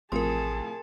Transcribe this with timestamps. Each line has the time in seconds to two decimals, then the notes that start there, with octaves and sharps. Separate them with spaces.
0.12 A1 A2 C3 F3 G#4 A#4 A5 C6